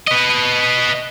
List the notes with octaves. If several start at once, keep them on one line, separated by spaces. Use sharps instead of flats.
B4 D#5